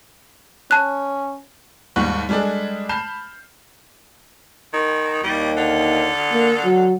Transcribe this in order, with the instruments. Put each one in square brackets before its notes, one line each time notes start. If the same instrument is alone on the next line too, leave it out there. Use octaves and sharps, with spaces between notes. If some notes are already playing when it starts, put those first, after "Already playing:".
[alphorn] C#4 [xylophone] A5 F#6
[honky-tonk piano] D#2 G#2 G3 C#6 F#6
G3 G#3 D4 G#4 A4
A5 B5 F6 G6 C7 E7
[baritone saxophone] D#3
[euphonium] D#2 [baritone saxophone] G3
[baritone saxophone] D3
[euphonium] A#3
F#3